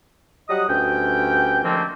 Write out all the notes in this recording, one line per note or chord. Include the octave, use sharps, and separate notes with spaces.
F#3 G3 D#5 F#5 D#6
D2 G2 C#4 G5
D3 D#3 F3 A3 A#3 C4